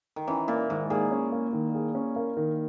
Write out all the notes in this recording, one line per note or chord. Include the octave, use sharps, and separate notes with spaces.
D#3
E3 C#4
A#2 A#3
G#2 D#3
A#2 G#4
C#4
A#3
D#3
G#4
C#4
A#3
D#3